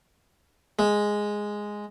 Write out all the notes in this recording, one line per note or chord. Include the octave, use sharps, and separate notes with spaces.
G#3